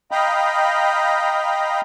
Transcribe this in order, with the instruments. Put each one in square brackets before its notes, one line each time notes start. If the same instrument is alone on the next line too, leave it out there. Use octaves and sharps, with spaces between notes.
[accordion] D#5 F5 G5 A#5 B5